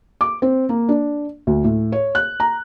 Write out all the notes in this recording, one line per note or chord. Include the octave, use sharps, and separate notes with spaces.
D6
C4
A#3
D4
D2
A2
C#5
F#6
A#5